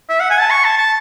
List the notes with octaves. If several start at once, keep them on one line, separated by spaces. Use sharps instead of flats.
E5
F#5
G#5
A5
C#6
A5
A5